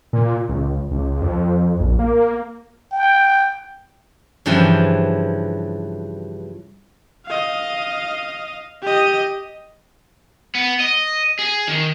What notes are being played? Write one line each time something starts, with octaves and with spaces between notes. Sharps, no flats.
A#2
C#2
C#2
F2
A#1
A#3
G5
G2 C#3 E3 F3 G5 G#5
D#5 F5
G4 D#5
B3
D#5
G#4
D#3